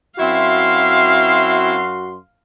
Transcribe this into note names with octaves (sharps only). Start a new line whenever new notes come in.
F#2 C4 E4 F#4 E5 F5 C6